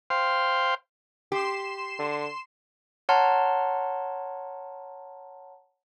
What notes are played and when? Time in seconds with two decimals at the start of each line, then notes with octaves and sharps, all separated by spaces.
0.10 C5 F5 G5 C6
1.32 G4 C6 C7 E7
1.99 D3
3.09 C#5 F#5 A5 A#5 C6 F6